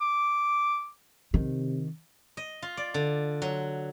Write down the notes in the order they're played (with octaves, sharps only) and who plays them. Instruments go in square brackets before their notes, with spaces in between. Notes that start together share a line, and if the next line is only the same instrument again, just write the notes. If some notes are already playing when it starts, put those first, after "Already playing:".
[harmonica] D6
[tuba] C3 [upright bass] D#3
[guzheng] D#5
F4
D5
D3
F#3